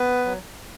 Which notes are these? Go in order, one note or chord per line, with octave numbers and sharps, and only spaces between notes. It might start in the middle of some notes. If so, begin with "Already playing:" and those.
Already playing: B3 B4
F#3